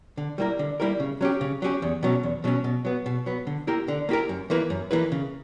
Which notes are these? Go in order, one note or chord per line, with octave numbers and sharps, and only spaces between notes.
D3
G3 A#3 E4 A#4
D3
G3 A#3 E4 A#4
C#3
F#3 C#4 G4
C#3
F#3 C#4 G4
E2
B2 F#3 C#4
E2
B2 F#3 C#4
B2
F#3 B3
B2
F#3 B3
D3
A#3 E4 G4 A#4
D3
A#3 E4 G4 A#4
F#2
E3 A#3 E4 B4
F#2
E3 A#3 E4 B4
C#3